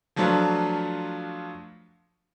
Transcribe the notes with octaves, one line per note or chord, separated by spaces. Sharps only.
F3 F#3 A3 D4 F4 B4